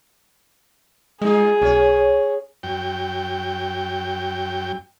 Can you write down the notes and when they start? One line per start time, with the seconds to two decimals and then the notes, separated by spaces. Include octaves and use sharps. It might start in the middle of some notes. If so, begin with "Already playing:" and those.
1.22 G3 G#3 D#4 F4 G#4
1.62 B1 C#4 C#5
2.63 F#2 G5